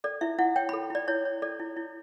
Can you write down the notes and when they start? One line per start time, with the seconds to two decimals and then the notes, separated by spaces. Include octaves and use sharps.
0.04 A4 D5
0.21 E4 E5
0.39 E4 F#5
0.56 C#5 G5
0.69 A4 B5
0.90 E4 D5
1.08 E4 C#5
1.25 C#5
1.42 A4 D5
1.59 E4
1.77 E4